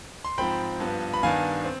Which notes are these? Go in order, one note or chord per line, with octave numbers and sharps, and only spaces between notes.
C6
G#2 F3 C4 G5 B5
G2 F3 B3
B5
G2 D#3 B3 D4 F5 G#5
C4